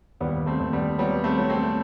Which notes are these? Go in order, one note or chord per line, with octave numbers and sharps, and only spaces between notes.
D#2 G3 B3
A3 C4
D#2
G3 B3
F#3 G3 B3
A3 C4
F#3
A3 C4